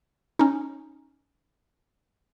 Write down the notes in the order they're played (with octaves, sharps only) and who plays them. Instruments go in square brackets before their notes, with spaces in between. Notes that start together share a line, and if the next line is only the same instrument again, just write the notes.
[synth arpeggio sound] C#4 D#4